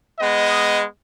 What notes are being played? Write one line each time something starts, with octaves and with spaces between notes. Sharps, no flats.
G#3 B3 D#5